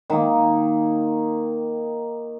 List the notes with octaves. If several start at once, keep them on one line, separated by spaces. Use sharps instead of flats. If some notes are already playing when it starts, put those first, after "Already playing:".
D#3 A#3